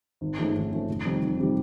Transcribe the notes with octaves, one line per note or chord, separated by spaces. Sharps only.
G#1
G#2 F3 A3 C#4
G#1
G#2 F3 A3 C#4
F1
F2 C3 D#3 G3
F1
C3 D#3 G3